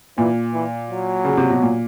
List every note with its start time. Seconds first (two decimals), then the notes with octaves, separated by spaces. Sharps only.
0.18 A#2 E3
0.54 E3
0.91 F#3
1.25 C#3
1.37 C3
1.50 B2
1.62 A#2